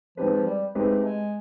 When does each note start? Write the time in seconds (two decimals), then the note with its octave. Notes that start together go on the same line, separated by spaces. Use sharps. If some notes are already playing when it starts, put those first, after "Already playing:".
0.17 F3 G#3 C4 D#4 G4 B4
0.32 F3
0.46 G3
0.75 G#3 A3 C4 D#4 G4 B4
1.04 G#3